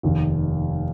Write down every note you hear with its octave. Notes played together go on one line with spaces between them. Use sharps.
F1 D#2 D#3